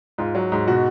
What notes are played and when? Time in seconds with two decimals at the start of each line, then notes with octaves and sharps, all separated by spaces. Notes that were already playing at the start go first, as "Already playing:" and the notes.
0.18 G#2 F4
0.35 F#3
0.52 G#2
0.67 B2 F#4